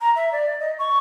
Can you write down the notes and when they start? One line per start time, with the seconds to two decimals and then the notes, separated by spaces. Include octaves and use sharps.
0.01 A#5
0.16 E5
0.32 D5
0.60 D#5
0.79 C#6